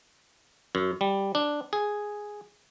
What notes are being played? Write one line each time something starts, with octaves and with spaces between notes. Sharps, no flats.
F#2
G3
D4
G#4